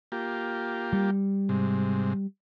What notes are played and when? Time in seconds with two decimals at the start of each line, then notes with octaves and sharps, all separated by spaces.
0.12 A#3 F4 G4
0.93 G3
1.49 G#2 C3